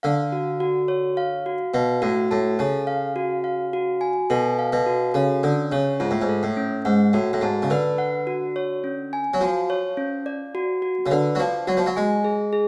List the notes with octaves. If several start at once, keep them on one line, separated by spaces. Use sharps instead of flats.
D3 F5
F#4
F#4
C#5
F5
F#4
B2 F5
A2 F#4
A2 A5
C#3 A4
F5
F#4
F5
F#4
G#5
B2 A4
F5
B2
F#4
C#3 A4
D3 C#4
C#3 C#5
G#2 F4
A2
G#2
A4
A2
C#4
G#2 F#5
A2 F#4
A2
G#2 A5
C#3
D3 B4
F#5
F#4
C#5
C#4
G#5
F#3
F3 F#4
C#5
C#4
D5
F#4
F#4
C#3
D3 B4
F#3
F3 D5
F#3 F#4
F3
F#3
G#3 G#5
G#4
G#4